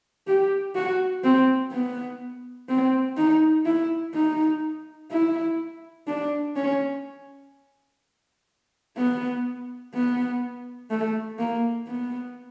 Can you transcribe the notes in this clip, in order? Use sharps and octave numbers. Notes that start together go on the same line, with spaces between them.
G4
F#4
C4
B3
C4
D#4
E4
D#4
E4
D4
C#4
B3
B3
A3
A#3
B3